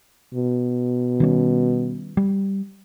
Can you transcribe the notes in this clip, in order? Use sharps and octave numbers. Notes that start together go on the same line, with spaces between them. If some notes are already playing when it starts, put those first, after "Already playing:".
B2
D#3 G3 C#4
G3